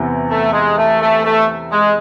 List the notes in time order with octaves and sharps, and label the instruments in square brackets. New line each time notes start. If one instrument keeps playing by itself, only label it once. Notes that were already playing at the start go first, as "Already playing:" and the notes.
Already playing: [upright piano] E2 C3 E3 B3
[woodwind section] A3
G#3
A3
A3
A3
G#3